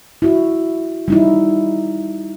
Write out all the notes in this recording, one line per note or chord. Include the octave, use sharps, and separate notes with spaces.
E4 F#4
G3 D#4 E4